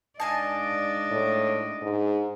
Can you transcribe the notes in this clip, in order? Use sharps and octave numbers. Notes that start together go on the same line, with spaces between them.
G#2 D4 D5 D#5 F5 G#5 A5
A2
G#2